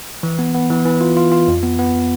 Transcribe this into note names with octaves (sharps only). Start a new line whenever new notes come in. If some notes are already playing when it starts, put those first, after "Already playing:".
E3
B3
B3
E3
E3
F4
F4
F4
F2
B3
B3